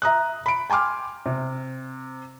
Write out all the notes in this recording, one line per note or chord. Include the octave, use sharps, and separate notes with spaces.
E5 A#5 D#6 F#6
B5 D7
G5 G#5 C6 D6 F6
C3